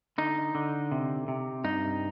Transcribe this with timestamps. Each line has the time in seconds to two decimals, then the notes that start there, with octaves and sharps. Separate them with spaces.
0.18 D3 D#4
0.55 D3
0.91 C3
1.28 C3
1.64 G2 D#4